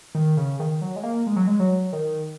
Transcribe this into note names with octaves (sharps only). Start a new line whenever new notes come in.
D#3
C#3
D#3
F#3
G#3
A#3
G#3
F#3
G#3
F#3
D#3